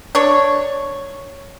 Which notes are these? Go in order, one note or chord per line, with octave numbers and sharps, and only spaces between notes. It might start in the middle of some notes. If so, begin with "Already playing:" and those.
D4 C#5